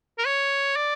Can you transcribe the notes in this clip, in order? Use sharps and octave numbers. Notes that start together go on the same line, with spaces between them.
A#4
C#5
D5